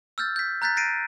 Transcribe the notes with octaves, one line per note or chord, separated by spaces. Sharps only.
E6 F6 G6 A6
G6 B6
A#5 F#6 G6 A6 B6
A6 A#6 C7 D7 D#7